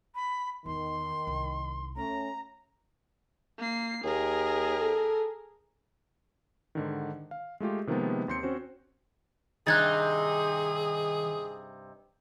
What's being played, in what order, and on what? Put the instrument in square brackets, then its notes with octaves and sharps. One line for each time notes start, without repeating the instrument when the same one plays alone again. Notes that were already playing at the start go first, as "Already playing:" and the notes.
[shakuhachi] B5
[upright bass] E2 [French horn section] D#3 [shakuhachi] C6
[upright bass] C2
[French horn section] A3 C#4 [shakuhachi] A#5
[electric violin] A#3 C7
[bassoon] D#2 [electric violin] G#4 A#4
[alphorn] A4
[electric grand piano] G#2 D3 D#3
F5
G#3 A3 F4 G4
C3 D#3 F3 G#3 A#3 B3
D#2 C4 C6 G6 C#7
C4 C#4 F#4 C5
[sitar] G2 C3 D#4 [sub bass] D#3 [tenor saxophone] G#4 [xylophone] F#6 G#6 A6